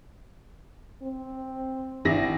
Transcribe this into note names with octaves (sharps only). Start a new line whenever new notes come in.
C4
G#1 E4 A#6